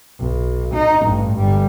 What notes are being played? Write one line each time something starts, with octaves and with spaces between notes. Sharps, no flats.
B1
D#4
A1 G2
G1 G3